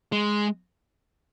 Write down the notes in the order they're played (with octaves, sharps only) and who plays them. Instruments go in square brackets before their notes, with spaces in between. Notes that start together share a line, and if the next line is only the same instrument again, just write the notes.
[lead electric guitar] G#3